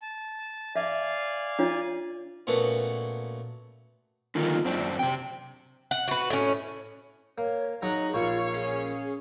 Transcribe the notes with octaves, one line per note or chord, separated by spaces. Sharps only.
A5
D5 E5 F5 G#5
D4 F4 C#5
A#2 A3 B3 C#4 D4 F#4
D3 D#3 A#3 D#4 F4
F#2 C4 D4
C3 G5
F#5
F#4 B4
A2 C#4
A#3 C#5
F#3 D#4 G#4 A#5 F#6
A#1 A#3 F4 C#5 F5 C#6
C#4 G#4